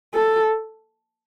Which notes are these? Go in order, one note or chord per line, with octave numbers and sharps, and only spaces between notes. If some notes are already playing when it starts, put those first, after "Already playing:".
A4